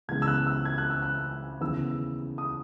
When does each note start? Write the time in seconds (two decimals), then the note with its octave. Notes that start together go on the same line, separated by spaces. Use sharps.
0.08 C#2 C#3 E3 G#3 B3 G#6
0.22 E6
0.27 F#6
0.47 E6
0.65 G#6
0.78 F#6
0.90 E6
1.03 F#6
1.61 D#2 C#3 E3 B3 E6
2.38 D#6